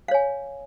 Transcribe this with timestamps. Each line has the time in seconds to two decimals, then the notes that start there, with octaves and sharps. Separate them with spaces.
0.08 F5
0.11 C#5
0.14 G#5